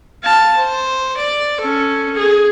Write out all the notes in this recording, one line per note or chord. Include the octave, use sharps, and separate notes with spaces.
F5 A5
C5
D5
C#4 A4
G#4